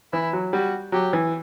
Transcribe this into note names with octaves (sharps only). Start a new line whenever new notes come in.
E3 E4
F#3
G3 F#4
F#3 G4
E3